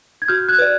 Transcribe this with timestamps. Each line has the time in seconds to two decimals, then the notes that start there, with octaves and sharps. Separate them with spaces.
0.22 G#6
0.28 F#4 F6 G6
0.48 F#6 G#6
0.58 B4 D5